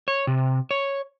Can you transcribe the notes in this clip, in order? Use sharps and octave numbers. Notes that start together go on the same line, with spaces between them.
C#5
C3
C#5